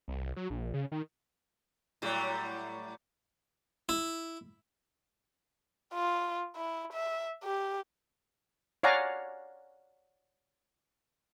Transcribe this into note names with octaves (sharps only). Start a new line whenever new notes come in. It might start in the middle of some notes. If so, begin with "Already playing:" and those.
C2
F#3
A#1
C#3
D#3
A2 F#3 G3
E4
F4
E4
E5
G4
C#5 D5 F5 F#5 G#5 A#5